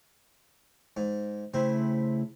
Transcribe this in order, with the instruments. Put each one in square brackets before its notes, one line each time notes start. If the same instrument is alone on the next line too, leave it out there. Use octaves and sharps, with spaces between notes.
[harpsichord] G#2
[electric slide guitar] C#3 A3 E4 [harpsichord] C4